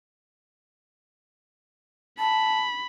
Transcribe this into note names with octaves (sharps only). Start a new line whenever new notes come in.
A5 B5